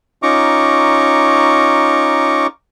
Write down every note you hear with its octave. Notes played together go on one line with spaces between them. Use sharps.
C#4 D#4 F4 A#5 C#6 D6